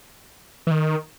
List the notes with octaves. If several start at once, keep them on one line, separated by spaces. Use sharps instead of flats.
E3
D#3